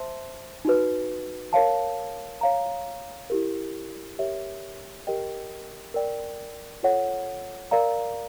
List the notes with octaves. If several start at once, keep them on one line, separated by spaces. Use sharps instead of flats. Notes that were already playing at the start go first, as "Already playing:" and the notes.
Already playing: C5 E5 A5 C6
D#4 F#4 B4
A#4 C#5 F5 A5
C#5 F5 A#5
E4 G4 A#4
G4 A#4 C#5 E5
G4 A#4 D#5 G5
A#4 D5 G5
F4 A4 C#5 F#5
A#4 D5 F5 A#5